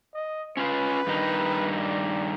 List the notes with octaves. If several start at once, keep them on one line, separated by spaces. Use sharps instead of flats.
D#5
C#4 F4 B4 F5
G2 D#3 D#4
D5